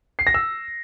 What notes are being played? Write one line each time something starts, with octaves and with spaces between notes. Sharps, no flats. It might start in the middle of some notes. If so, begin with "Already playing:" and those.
C7
A#6
E6